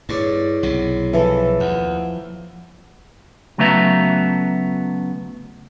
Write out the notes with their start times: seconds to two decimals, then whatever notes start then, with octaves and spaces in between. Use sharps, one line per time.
0.09 G2 E4 G#4 C#5 D5 C#6
0.63 B1 C3
1.13 E3 F3 A4
1.60 D#2 F#5
3.58 C#3 F#3 A3 B3 E5 A#5